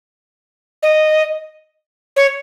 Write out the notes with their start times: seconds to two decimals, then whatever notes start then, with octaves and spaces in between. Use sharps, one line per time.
0.83 D#5
2.16 C#5